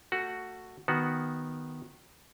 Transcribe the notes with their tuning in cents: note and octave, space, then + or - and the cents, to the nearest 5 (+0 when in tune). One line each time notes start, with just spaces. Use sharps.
A3 +20 F#4 +0
D#3 +0 B3 +0 F#4 +0